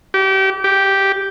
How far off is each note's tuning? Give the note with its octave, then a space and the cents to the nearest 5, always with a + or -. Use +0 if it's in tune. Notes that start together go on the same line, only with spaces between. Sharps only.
G4 -30
G4 -5